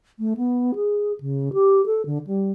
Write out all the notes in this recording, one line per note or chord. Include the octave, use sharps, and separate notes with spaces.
A3
B3
G#4
C#3
G4
A4
D3
G3